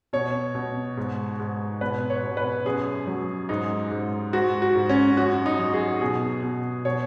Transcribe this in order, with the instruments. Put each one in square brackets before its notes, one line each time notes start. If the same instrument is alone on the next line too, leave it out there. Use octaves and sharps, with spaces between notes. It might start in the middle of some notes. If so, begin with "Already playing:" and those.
[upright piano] B2 C#5
B2
G#2
G#2
B2 B4
C#5
B2
B4
F#2 G#4
F#3
G#2 D#4
G#2
G#2 F#4
F#4
G#2
C#4
F#2 F#4
D#4
F#3
G#4
B2 G#4
B2
B2 C#5